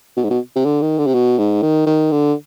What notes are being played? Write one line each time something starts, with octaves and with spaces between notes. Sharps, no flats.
B2
G#2
B2
C3
D3
D#3
D3
C3
B2
G#2
D#3
D#3
D3